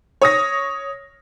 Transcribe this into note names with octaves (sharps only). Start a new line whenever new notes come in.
C#5 D#6 A#6